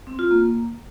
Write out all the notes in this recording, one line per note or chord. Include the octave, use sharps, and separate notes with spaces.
C4
F4
A#3